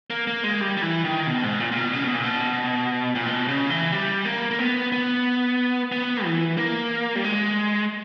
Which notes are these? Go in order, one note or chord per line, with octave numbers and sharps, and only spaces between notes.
A#3
A#3
G#3
G3
G3
E3
D#3
B2
G#2
A#2
A#2
B2
C#3
B2
A#2
B2
A#2
B2
C#3
E3
G3
A#3
A#3
B3
B3
B3
E3
A#3
G3
G#3